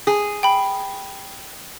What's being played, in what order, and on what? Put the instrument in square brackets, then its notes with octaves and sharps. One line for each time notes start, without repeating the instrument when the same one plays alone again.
[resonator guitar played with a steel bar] G#4
[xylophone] G5 B5